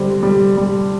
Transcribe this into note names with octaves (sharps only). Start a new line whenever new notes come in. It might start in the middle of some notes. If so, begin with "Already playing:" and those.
Already playing: D3 G3 C4
G3
G3